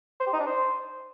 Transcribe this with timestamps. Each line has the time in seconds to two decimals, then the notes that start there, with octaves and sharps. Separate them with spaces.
0.20 C5
0.27 G4
0.33 D#4
0.40 D4
0.46 C5